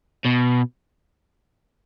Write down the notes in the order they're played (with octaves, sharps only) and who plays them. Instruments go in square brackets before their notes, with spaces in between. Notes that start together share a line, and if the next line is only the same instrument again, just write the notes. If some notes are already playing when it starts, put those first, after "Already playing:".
[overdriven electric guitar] B2